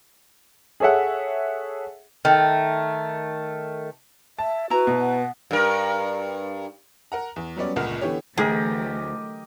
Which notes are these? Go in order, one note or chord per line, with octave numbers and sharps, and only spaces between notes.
G#4 A4 C#5 E5 F#5
D#3 A3
E5 A5
E4 F#4 B4 A#5
B2
F#5
G2 A#4
A#4 F#5 A#5
E2
F#3 G3 B3 C#4 D5
G1 C#2 A#2 A#4 F#5 F6
D3 E3 B3 G4 C#5
D2 E3 F#3 A3 G4 G#4 A#4 D#5